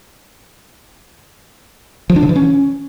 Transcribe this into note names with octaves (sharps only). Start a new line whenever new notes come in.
F3
D4
C#3
E3
C#4